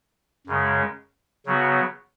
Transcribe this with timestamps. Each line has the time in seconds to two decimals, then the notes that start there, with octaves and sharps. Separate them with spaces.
0.47 F#2 C#3 G#3
1.46 C#3 F#3 B3 F#4